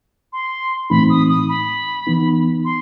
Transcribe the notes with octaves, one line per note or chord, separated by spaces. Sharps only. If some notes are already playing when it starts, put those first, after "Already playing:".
C6
A2 E3 A3 C4 D#4 B5
D#6
D#6
B5
E3 B3 D#4
C6